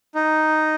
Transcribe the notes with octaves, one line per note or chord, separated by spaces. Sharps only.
D#4